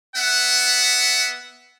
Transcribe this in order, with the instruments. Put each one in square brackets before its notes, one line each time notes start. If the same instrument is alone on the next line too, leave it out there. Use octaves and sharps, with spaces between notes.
[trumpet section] B3 E5 F#5